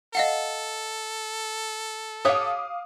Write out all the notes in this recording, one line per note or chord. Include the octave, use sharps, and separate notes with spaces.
A4 D#5 F5 F#5
G4 C#5 F5 F#5 D6 D#6